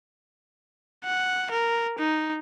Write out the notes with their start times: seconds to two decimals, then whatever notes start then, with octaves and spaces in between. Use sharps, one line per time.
1.05 F#5
1.51 A#4
1.99 D#4